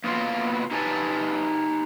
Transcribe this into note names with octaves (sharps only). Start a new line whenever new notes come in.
A#3 B3 F4 F#4 F5
D#4 G4 B4 G#5 A5